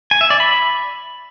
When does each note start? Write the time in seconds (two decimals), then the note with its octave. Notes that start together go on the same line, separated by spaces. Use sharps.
0.11 G#5
0.21 E5
0.30 D5
0.40 B5